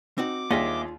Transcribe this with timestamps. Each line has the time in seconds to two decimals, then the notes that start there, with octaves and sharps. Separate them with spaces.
0.18 C4 D#4 F#4 D6
0.51 D#2 A#3 D4 F4 G#4 D#5 E5 G5